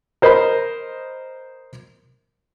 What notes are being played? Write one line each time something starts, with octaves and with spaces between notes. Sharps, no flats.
A#4 C5 D#5 B5